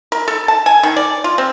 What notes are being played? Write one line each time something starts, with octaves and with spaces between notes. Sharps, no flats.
A#4
A4
A5
G#5
D#3
D5
F4
C4